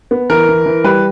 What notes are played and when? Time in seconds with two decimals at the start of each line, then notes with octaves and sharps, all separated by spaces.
0.11 B3
0.30 E3 A#4
0.49 E3
0.66 E3
0.84 G3 B4